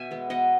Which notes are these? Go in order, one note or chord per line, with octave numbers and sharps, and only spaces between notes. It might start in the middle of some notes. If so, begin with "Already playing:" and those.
Already playing: B2 E5 G#5
G#3 B3
B2 D#5 F#5